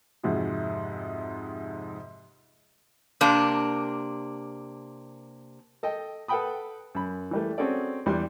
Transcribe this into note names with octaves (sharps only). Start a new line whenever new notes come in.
F2 G#2 C3 F#4 G#4
C3 A#3 D4
A4 D#5 G5
A4 B4 F#5 G5 B5 D#6
F#2 B5
E3 G3 A3
C4 C#4 F#4 G#4 A4 D5
E2 G3 D4 C6